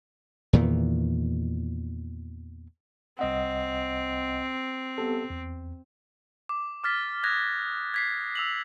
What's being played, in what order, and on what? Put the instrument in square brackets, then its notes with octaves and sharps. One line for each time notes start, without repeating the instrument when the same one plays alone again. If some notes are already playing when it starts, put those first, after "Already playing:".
[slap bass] E2 A#2 D#3 E3
[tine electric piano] C2 D#5 F#5 [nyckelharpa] C4
[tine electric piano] B3 G4 A4
E2
[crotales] D6
D6 F6 A6 B6
D#6 F6 F#6 G#6 A#6
G#6 B6 C7
E6 F7 F#7